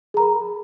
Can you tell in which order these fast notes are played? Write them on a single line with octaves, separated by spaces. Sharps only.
G#4 A#5 A#4 B5